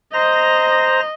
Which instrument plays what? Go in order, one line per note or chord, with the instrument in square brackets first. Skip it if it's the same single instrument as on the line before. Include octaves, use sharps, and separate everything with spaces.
[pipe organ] C5 A#5 A#6 [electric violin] D#5